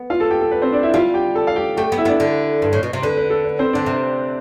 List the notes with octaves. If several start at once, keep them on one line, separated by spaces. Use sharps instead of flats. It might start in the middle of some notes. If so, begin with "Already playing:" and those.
Already playing: B3
F4 F5
A4 A5
G4 G5
A4
B4
C4 C5
D4 D5
E4 E5
G3 F4 F5
G4 G5
A4 A5
F5
G4 G5
A3 G4 G5
B3
E4 E5
B3 D4 D5
D3
G2
A2
B2
C3
D3 B4
B4
A4
B4
C4 C5
D3 D4 D5
C3